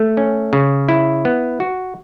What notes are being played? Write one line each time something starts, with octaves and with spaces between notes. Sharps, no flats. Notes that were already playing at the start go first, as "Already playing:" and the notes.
Already playing: A3
C#4
C#3
E4
B3
F#4